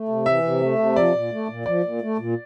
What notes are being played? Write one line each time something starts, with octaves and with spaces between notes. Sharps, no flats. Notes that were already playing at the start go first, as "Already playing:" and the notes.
Already playing: A3
C3
E3 E5
C3
A3
C3
F3 D5
A#2
A3
A#2
F3 D5
A#2
A3
A#2